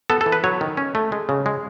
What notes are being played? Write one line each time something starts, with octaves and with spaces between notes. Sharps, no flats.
B3 A4
A4
E3
B4
F#3 C#5
D#3
C#4
A3
G#3
C#3
G#3